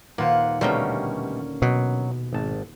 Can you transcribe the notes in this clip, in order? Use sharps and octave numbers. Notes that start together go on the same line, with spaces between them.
D#1 A#3 F4 B4 C5 F5 F#5
B2 D3 G3 A3 A#3 C#4
B2 F#3
G#1 A5